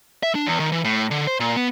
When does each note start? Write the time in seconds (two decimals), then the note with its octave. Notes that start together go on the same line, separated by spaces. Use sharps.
0.23 E5
0.35 D4
0.47 E2
0.60 D#3
0.72 E3
0.84 A2
1.11 D3
1.27 C5
1.40 A#2
1.56 B3